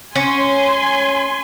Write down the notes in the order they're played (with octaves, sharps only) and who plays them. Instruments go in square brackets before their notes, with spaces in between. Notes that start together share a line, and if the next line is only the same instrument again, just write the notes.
[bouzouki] C#4 [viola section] G#5 C6